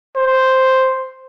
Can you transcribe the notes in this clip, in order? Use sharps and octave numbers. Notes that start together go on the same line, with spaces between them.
C5